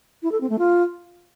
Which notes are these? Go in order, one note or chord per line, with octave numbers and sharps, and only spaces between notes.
E4
A4
C4
A3
F4